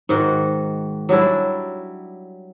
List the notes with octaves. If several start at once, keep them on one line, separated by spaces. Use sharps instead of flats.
G#2 D#3 F#4
F#3 G3 D4 E4